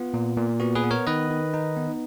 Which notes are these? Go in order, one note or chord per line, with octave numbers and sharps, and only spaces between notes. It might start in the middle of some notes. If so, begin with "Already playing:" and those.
Already playing: B3 F4
A#2
A#2
B3 F#4
G#4 B4
B3
A#4 C#5
D#3 B4 D#5
D#3
D#4
B3